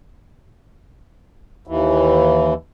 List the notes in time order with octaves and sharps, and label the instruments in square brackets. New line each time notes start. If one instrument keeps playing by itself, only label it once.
[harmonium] D#2 E3